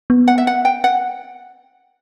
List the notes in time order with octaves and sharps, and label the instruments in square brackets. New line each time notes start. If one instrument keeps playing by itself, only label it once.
[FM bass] B3
[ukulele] F#5
E5
F#5
G5
F#5